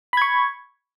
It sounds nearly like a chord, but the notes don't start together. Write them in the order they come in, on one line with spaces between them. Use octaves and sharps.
B5 G#6 C#6